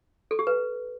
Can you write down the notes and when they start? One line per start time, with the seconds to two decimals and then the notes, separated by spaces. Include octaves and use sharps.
0.31 A4
0.39 G4
0.47 B4